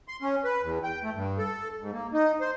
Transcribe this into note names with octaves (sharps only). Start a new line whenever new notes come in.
C6
C#4
B4
E2
G5
A3
G2
A4
G#2
A#3
D#4
C5